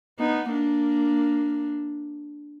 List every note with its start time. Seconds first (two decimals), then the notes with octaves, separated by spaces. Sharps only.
0.19 B3 D#4
0.51 A#3 D4